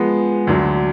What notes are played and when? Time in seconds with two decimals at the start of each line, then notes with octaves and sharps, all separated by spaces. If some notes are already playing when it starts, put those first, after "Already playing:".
Already playing: F3 G#3 B3
0.47 D2 D3 F#3